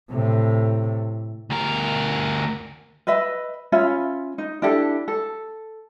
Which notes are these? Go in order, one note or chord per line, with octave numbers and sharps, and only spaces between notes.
A2 C3
D2 A#4
B4 D#5 E5 B5
C#4 F4 E5 B5
D#4
D4 E4 G4 A4
A4